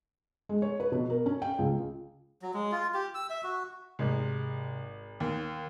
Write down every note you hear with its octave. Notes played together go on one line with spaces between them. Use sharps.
G#3
C#5
B4
B2
A#4
C#4
G5
C#2
F#3
G#3
F4
G4
E6
E5
F#4
G#1 C3 G#3
D#2 D#3